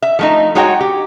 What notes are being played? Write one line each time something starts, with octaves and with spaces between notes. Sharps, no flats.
E5
F3 A3 D#4
G#3 D#4 F#4 C#5 F#5 G5
G4